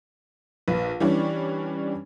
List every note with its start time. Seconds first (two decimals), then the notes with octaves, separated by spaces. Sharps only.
0.68 A#1 B4
1.00 E3 G3 C#4 D4